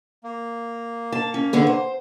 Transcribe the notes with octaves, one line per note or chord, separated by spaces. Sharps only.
A#3
A5
C#4
D3 B3 G#4
C5